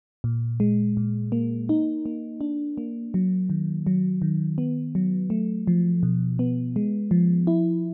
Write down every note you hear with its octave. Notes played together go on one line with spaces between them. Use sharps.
A#2
G#3
A#2
A#3
D#4
A#3
D4
A#3
F#3
D#3
F#3
D#3
B3
F#3
A3
F3
B2
B3
G#3
F3
E4